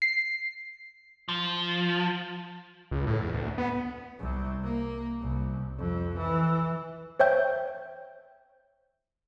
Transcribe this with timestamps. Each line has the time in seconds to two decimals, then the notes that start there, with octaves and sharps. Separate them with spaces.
0.02 C7
1.29 F3
2.91 C#2
3.07 A2
3.21 E2
3.33 D2
3.58 B3
4.20 C2 C3
4.64 A#3
5.21 C2
5.79 F2
6.18 E3
7.20 C5 C#5 E5 G5 G6